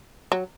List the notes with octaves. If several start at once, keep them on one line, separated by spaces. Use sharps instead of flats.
F#3